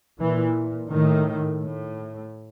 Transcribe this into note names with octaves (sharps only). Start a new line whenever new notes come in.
A#2 E3
A2 D#3
A2